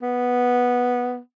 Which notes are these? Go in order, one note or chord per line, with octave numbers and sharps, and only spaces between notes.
B3